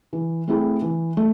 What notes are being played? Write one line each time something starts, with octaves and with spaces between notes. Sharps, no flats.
E3
A3 C4 E4 G#4
E3
A3